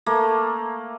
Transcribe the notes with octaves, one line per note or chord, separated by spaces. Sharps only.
A3 A#3